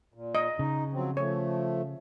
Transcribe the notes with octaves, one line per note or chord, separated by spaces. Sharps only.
A#2
D#5
C#3 D#4
F3 F#3 C4
F3 A3 C#5